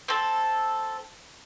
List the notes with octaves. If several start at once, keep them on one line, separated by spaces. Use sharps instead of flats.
C4 A4